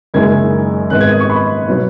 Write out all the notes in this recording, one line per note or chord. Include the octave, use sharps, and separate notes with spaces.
F#1 F#2 D#3 G#3 G#6
G#1 G#2 D#3 B3 F#6
G#6
D#6
C#6
B5
B2 F#3 B3